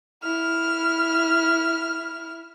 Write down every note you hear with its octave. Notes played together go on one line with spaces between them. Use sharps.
E4 F6